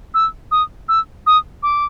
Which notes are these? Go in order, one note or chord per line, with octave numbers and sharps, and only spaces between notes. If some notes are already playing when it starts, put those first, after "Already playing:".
E6
D#6
E6
D#6
D6